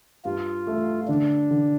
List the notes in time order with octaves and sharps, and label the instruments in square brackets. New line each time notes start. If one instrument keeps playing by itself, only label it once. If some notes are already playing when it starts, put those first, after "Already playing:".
[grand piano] G2 [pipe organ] F4
[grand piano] A3
[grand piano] D3 [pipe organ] D4
[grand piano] D3